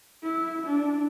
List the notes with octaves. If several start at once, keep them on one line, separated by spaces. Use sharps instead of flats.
E4
D4